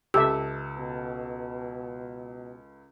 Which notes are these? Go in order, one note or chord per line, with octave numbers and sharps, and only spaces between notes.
C#2 G4 A4 E5 E6
B2